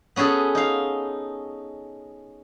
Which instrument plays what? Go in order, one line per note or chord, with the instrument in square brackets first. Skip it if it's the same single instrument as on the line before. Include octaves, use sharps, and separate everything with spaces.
[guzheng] B3 C#4 F#4 G#4 A4
D#4 F5